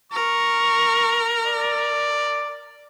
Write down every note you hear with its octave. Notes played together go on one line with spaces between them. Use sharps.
A#4 C#6
D5